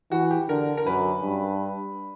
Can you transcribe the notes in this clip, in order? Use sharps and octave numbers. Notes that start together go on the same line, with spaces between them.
E3 F#4
G4
D3 A#4
A#4
F#2 B4
G2